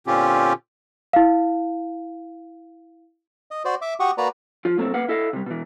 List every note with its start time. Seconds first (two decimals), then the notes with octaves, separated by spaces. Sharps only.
0.07 A#2 D3 C4 C#4 F4 G4
1.13 E4 F5
3.51 D#5
3.65 F#4 C5 D5
3.82 E5 D6
4.00 F#4 G4 F#5 C#6 D#6
4.18 A#3 F#4 B4 D5 A#5
4.65 F3 F4
4.78 A2 F#3 A3 A#3 C4
4.94 A#3 A#4 B4 F5 F#5
5.09 E4 A4 D#5 F5
5.33 C3 G3
5.46 B2 E3